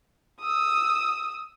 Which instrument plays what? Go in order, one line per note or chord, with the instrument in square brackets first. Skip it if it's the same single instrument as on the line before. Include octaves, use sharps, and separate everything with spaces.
[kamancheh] D#6 E6